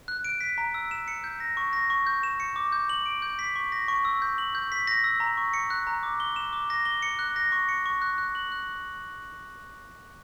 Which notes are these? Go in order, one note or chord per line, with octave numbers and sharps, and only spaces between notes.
F#6
D7
B6
A#5
E6
E7
C#7
G6
A#6
C#6
A#6
C#6
G6
E7
C#7
D6
G6
F#7
D7
G6
B6
C#6
A#6
C#6
E6
G6
F#7
G6
B6
A#6
E6
A#5
C#6
C#7
F#6
A#5
D6
G7
E7
D6
A#6
G7
C#7
F#6
A#6
C#6
C#7
C#6
F#6
F#6
F#7
F#6